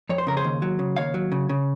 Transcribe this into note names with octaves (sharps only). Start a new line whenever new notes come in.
F2 C#5
C5
C#3 A#4
G#4 C5
D#2
F#3
C#3
D#2 C#5 F5
F#3
C#3
C#3